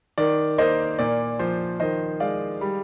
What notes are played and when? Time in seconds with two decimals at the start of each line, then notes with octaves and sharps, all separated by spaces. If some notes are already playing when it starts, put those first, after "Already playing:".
0.18 D#3 D5
0.58 A#3 C5 D#5
0.99 A#2 D5
1.39 F3 C5
1.80 D#3 C5 D#5
2.20 G#3 D5 F5
2.61 G3